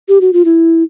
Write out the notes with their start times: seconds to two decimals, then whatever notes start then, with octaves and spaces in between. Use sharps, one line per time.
0.08 G4
0.21 F#4
0.33 F4
0.45 E4